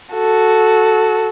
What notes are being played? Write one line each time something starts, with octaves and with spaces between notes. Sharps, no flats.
F#4 A4